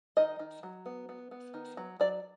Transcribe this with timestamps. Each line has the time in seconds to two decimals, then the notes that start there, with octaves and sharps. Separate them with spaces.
0.17 D#3 D#5
0.39 D#3
0.63 F#3
0.86 B3
1.09 B3
1.31 B3
1.54 D#3
1.77 F#3
2.00 F#3 D5